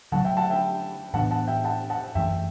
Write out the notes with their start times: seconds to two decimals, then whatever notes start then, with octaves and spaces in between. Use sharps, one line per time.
0.12 D3 F#3 A3 F#5 A5
0.24 E5 G5
0.37 F#5 A5
0.50 E5 G5
1.14 A2 E3 B3 D4 F#5 A5
1.31 F#5 A5
1.47 E5 G5
1.64 F#5 A5
1.90 F#5 A5
2.15 F#2 E3 A3 E5 G5